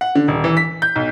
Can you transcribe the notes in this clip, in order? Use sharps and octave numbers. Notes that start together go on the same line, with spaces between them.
F#5
D3
D#1
E3
B6
G6
B1